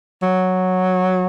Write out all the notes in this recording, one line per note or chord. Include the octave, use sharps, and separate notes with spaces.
F#3